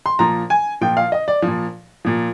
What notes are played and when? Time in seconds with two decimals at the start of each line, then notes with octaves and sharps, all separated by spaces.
0.06 C6
0.19 A#2 F3 A#5
0.50 G#5
0.81 A#2 F3 G5
0.97 F5
1.12 D#5
1.28 D5
1.42 A#2 F3
2.05 A#2 F3